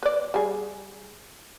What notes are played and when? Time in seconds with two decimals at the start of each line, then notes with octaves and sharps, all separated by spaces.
0.03 B4 D5
0.34 G3 G#4